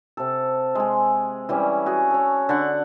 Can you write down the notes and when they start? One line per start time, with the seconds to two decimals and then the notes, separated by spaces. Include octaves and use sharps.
0.17 C3 A4
0.75 G#3 G#4
1.49 E3 G3 C#4
1.86 F#4 G#4
2.11 A4 C#5
2.49 D3 F#5